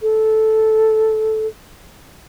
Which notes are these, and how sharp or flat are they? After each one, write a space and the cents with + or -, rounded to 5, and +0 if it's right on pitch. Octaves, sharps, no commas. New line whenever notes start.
A4 -10